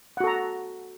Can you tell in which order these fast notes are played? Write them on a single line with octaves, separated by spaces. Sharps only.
F#5 F#4 A4 A#5